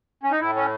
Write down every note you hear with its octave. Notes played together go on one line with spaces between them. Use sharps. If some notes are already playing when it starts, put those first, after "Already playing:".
C#4
D#4
A2 E4
C#4